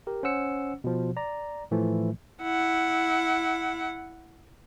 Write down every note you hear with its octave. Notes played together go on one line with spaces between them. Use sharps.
G4 A#4
C#4 C5 F#5 E6 C#7
B2 F3
D5 A#5
A2 E3 F3 A3
E4 F#5